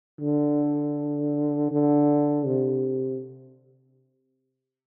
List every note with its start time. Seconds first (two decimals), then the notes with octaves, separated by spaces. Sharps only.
0.21 D3
1.71 D3
2.46 C3